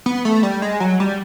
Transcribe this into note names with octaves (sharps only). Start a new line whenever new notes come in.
B3
A3
G3
G#3
F#3
G3